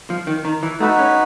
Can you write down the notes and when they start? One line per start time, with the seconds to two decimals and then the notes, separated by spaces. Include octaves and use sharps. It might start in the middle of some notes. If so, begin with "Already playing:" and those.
0.10 F3
0.27 D#3
0.45 D#3
0.63 E3
0.80 A3 D#4 F#4 B4
0.99 C#4